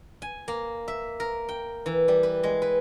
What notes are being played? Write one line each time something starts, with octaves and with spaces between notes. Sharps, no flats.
G#5
A#3
E5
A#4
G5
E3
G3
B4
G#3
B4